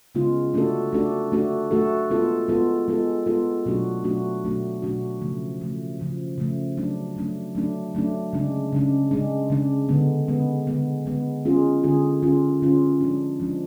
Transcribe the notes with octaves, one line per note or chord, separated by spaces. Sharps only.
C#3 G#3 B3 F4
A3 D4 F#4 A4
A3 D4 F#4 A4
A3 D4 F#4 A4
A3 D4 F#4 A4
G#3 B3 F4 A4
G#3 B3 F4 A4
G#3 B3 F4 A4
G#3 B3 F4 A4
B2 F#3 A3 D4 F#4
B2 F#3 A3 D4 F#4
B2 F#3 A3 D4 F#4
B2 F#3 A3 D4 F#4
C#3 F3 A3
C#3 F3 A3
C#3 F3 A3
C#3 F3 A3
F#3 A3 D4
F#3 A3 D4
F#3 A3 D4
F#3 A3 D4
C#3 G#3 D4
C#3 G#3 D4
C#3 G#3 D4
C#3 G#3 D4
D3 G#3 B3
D3 G#3 B3
D3 G#3 B3
D3 G#3 B3
D3 G#3 C#4 F4 G#4
D3 G#3 C#4 F4 G#4
D3 G#3 C#4 F4 G#4
D3 G#3 C#4 F4 G#4
F3 G#3 D4
F3 G#3 D4